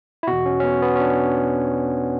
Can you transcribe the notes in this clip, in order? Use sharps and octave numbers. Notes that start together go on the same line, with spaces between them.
E4
E2 B2 F#4
C#4
C#4
B3
B3
C#4
D4